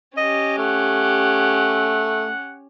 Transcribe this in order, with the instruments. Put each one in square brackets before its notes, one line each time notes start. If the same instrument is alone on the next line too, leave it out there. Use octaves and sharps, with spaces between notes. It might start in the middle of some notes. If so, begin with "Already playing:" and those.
[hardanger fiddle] C#4 G4 [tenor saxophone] D#5
[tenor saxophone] A3 [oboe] F#5